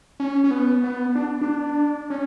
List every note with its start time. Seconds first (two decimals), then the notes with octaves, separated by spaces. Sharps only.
0.20 C#4
0.44 C#4
0.51 B3
0.84 B3
1.15 D4
1.41 D4
2.10 C#4